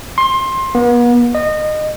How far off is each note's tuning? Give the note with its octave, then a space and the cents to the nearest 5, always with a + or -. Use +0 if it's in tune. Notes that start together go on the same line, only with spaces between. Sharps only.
C6 +20
B3 -40
D#5 -25